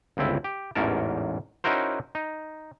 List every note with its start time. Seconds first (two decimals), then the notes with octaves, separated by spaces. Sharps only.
0.17 G1 C#2 C4 E4
0.44 G4
0.75 A1 E2 G#2 C#4 A#4 A5
1.64 C#4 D#4 E4 F#4 A#4 C5
2.15 D#4